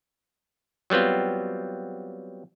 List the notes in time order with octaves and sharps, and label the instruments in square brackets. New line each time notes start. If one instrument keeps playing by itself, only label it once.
[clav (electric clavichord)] F#3 G3 B3 C4 F4